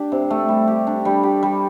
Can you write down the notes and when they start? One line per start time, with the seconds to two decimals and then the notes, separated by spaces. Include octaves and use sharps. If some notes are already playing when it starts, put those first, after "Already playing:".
Already playing: D4 G4
0.12 C3
0.30 A3
0.48 G3
0.68 G4
0.87 D4
1.05 G3
1.23 G4
1.43 G3